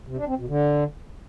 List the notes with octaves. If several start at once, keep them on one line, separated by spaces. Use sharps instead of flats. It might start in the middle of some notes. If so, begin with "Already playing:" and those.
C3
D4
C4
B2
D3